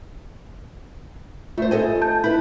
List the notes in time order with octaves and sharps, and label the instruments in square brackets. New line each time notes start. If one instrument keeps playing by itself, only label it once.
[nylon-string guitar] A3 C5 [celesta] F4
[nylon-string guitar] A4 D#5 G#5
[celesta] A5 G6
[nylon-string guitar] E4 B4 [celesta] B5